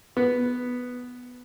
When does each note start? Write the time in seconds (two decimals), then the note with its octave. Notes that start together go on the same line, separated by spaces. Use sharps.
0.17 B3